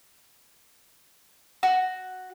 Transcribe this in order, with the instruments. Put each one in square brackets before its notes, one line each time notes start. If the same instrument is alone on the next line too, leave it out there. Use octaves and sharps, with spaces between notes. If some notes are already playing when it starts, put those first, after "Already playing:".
[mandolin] F#4